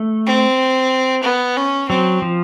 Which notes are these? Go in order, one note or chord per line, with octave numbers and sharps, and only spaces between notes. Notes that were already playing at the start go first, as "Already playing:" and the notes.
Already playing: A3
C4
B3
C#4
F#3 C4
F3